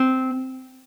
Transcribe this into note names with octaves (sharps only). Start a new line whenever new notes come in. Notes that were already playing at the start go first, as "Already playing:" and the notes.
Already playing: C4